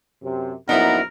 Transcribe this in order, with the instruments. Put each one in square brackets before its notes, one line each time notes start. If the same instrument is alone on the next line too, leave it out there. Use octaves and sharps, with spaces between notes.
[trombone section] F#2 C3
[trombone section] A#1 F#2 [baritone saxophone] B3 [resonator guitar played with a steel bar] D#4 E4 [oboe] A#4